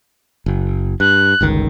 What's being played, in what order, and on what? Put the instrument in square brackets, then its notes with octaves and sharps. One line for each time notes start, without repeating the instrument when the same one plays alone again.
[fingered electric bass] F#1
[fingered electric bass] G2 [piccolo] F#6
[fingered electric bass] G1 C#2 D#3